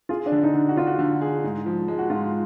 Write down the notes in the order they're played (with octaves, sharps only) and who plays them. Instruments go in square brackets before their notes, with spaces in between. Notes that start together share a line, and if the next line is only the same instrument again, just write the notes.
[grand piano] F4 [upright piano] G#4
[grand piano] D4
[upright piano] D3
[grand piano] D#4
[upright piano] D3
[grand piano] F#4
[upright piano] D4 [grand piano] F4
[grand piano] F#4
[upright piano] D3
G#4
G#2
F3
G#3
[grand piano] F#4
[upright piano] G#2 [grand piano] F4